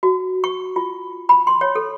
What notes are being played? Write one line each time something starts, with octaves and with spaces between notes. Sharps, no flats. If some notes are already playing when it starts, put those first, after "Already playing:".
F#4
C#6
F4
B5
C6
C#5
A4